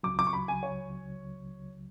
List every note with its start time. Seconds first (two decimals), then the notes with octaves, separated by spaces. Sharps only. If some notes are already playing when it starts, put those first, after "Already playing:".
0.03 C#2 C#3 F#3 D6
0.19 D6
0.27 C#6
0.33 B5
0.48 G#5
0.63 C#5